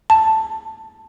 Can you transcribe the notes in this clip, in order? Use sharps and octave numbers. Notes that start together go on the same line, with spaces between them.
A5